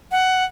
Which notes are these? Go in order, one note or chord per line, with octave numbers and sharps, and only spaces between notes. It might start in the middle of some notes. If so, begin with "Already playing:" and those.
F#5